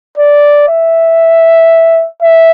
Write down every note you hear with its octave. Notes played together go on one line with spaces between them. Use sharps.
D5
E5
E5